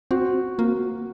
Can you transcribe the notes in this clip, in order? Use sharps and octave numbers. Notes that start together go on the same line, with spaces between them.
C4 F#4
A#3 F#4